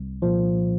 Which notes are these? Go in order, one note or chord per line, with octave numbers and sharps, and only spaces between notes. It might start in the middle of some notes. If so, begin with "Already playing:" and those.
Already playing: C2
A#2 F3